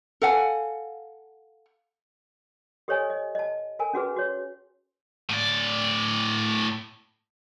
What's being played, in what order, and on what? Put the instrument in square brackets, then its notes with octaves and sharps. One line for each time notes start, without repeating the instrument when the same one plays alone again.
[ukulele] A4 F5 F#5 G#5
[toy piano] G4 A4 C5 C#5 D#5 G#5
D#5
D#5 A5
A4 A#4 G#5 A5
C#4 F#4 G#4 B4
F#4 C#5
[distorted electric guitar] A2 D5